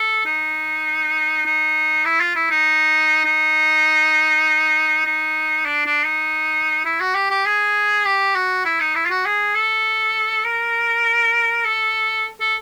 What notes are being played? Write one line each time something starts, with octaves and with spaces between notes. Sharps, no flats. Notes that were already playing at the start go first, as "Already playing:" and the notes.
Already playing: A4
D#4
D#4
E4
F4
E4
D#4
D#4
D#4
D4
D4
D#4
E4
F#4
G4
G4
G#4
G4
F#4
E4
D#4
E4
F4
F#4
G#4
A4
A#4
A4
A4